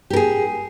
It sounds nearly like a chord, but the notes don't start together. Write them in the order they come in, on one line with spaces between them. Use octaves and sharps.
G4 A#4 G#4